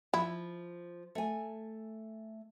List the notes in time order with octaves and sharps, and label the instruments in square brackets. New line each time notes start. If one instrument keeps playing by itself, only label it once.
[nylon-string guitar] F3 [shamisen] E4
[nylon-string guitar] A3 G#5